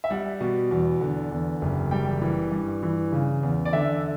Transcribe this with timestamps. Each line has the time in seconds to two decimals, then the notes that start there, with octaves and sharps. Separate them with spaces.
0.04 E5
0.10 G3 F#5
0.41 B2
0.71 E2
1.01 D3
1.31 E2
1.62 F#1
1.91 G3 G5
2.21 E3
2.52 G2
2.83 E3
3.12 C#3
3.43 E2
3.65 D5
3.73 D3 E5